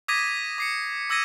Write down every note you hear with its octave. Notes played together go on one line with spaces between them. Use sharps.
D6 D#6 G#6 A#6 B6 D#7
D6 C7 C#7
D6 E6 G#6 A#6 D#7